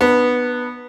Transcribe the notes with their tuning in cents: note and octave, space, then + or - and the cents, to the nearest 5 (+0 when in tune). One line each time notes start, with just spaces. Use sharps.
B3 -5 D4 +40